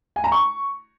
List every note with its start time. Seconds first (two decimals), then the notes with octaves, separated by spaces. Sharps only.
0.16 G#5
0.24 A#5
0.32 C#6